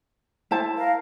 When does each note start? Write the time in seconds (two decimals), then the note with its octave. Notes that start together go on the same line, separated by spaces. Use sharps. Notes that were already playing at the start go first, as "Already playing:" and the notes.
0.51 E4 C5 A5
0.77 A#4 F5